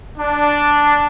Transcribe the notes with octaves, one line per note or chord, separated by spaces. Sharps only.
D4